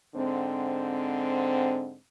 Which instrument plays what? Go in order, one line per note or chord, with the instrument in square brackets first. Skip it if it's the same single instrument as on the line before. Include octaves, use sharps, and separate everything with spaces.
[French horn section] G#2 D3 C4